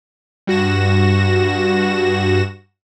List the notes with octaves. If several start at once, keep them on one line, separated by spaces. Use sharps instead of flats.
G2 F#4 A#6 E7